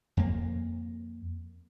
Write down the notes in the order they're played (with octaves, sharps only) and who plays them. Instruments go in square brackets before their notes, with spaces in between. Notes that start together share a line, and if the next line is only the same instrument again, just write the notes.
[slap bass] F2 A#3